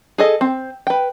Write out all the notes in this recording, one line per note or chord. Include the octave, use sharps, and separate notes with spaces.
G#4 A4 D#5
C4
B4 G5